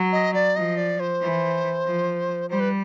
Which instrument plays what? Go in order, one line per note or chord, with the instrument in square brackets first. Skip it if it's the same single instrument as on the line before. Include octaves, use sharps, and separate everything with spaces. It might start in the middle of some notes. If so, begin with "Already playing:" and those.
Already playing: [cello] F#3
[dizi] D#5
D5
[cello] F3 [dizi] D#5
[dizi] D5
C5
[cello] E3
F3
[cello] G3 [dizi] C5
[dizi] B4